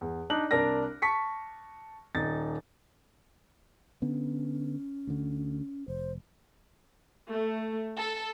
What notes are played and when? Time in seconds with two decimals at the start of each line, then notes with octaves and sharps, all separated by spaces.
0.01 E2
0.30 D4 D#4 F#6 F#7
0.51 C2 D4 A#4 D5 A#6
1.02 A5 C#6 B6 C#7
2.15 D#1 D#4 A6
4.02 D3 B3 C#4
5.07 D2 D3
5.88 F1 C5
7.31 A3
7.96 A4